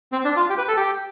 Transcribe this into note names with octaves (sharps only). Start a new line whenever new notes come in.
C4
D4
F4
G4
B4
A4
G4